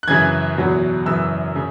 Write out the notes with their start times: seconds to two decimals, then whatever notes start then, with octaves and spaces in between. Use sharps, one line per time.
0.03 F#6
0.08 F#2 C#3 E3 G#6
0.57 E2 B2 F#3
1.06 F#2 C#3 E3 E6
1.55 C#3